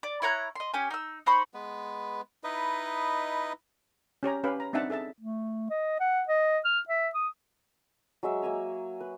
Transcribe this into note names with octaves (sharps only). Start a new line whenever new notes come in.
D5
E4 C#5 A#5 F#6
D#5 C6
C#4 G4 G#5
D#4 E6
D#4 C5 B5 C#6
G#3 B3 B4
D#4 E4 B4 D#5
C#4 G4 C#5 A#5
C#4 G4 B4 F5 B5
A#5
C4 D4 D#4 E5 F#5 A5
G#4 A4 E5 A5
A3
D#5
F#5
D#5
F6
E5
D#6
F#3 G#3 E5
A#3 E5 G#5 A#5
B4